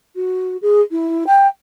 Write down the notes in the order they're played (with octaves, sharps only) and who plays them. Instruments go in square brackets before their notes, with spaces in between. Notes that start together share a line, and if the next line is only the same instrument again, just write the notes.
[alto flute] F#4
G#4
E4
G5